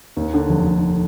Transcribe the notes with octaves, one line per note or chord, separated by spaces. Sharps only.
D#2
D3
F1
F1